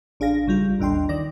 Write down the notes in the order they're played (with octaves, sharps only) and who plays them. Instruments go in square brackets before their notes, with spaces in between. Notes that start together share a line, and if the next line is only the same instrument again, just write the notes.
[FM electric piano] A1 D4 G#4 F5 A#6
A1 C#3 G3 F4
A1 D#2 D4 G5 C6
D#3 D5 A#6